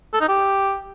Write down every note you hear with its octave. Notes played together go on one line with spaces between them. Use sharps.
A4
D#4
G4